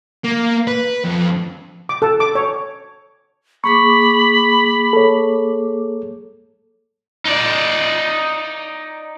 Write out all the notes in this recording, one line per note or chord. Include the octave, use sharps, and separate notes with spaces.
A#3
B4
F2
D6
A4
D6
C#5
A#3 G#4 B5 C#6 D6
A4 C#5
D#4 D5